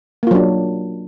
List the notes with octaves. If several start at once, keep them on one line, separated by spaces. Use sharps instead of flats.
F#3 A#3 D4 F4